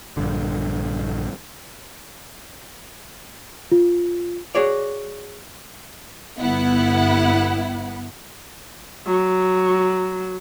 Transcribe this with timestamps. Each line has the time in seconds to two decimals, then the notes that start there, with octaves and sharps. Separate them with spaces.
0.17 A#1 G2 D3
3.72 F4
4.55 F#4 G#4 C#5 D5
6.39 G1 B3 E4 F#5
9.07 F#3